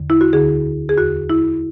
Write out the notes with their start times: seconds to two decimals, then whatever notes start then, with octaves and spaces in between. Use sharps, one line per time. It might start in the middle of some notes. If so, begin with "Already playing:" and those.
Already playing: E2 D3
0.10 E4
0.21 F#4
0.33 D2 D3 G#4
0.89 G#4
0.97 E2 D3 F#4
1.30 E4